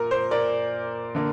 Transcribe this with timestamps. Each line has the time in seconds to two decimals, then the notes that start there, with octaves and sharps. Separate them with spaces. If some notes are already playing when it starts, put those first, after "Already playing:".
Already playing: A#2 A#4
0.11 C5
0.31 A#4 D5
1.15 D3 A#3